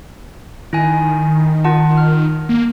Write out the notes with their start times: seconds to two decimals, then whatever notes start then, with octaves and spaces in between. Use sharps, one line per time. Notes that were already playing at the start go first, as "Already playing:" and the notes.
0.73 D#3 E4 G#5
1.64 F4 F#5 A5
1.98 F6
2.49 A#3